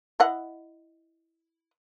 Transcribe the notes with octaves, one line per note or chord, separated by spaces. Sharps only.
E4 D#5 F#5